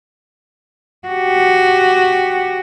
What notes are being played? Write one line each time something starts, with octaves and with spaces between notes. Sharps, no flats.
F#4 G4